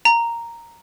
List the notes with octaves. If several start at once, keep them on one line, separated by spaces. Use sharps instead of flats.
A#5